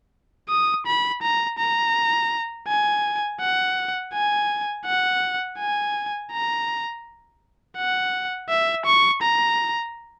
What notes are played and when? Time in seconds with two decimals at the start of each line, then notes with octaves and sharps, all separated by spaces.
0.49 D#6
0.86 B5
1.22 A#5
1.59 A#5
2.68 G#5
3.41 F#5
4.14 G#5
4.86 F#5
5.58 G#5
6.32 A#5
7.77 F#5
8.49 E5
8.86 C#6
9.22 A#5